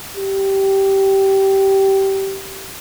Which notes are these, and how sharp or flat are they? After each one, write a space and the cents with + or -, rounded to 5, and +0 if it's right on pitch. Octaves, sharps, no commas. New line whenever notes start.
G4 -15